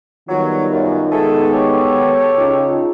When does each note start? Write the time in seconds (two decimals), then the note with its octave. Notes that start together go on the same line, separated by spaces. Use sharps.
0.29 D#3 F#3 G3 B3 F4
0.72 F#2
1.12 G#3 A3 B3 G#4 A4
1.53 G4 A4 C#5
2.37 C#3 D#4 F4